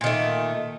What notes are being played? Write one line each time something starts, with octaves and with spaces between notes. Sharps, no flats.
A#2 D#3 A3